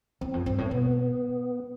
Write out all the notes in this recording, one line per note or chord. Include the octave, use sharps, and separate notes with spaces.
E2 C4
F2
G2 C4
A2
C4
B2 B3